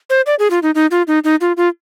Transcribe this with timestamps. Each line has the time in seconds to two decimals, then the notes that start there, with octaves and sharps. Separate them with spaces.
0.10 C5
0.26 D5
0.39 G#4
0.51 F4
0.63 D#4
0.75 D#4
0.91 F4
1.08 D#4
1.24 D#4
1.41 F4
1.57 F4